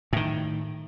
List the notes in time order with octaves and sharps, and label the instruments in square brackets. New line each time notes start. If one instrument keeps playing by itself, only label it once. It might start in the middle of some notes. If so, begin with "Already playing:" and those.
[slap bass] A2 D#3